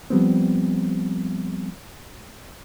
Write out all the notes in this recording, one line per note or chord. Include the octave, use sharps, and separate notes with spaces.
F3 G3 B3 C4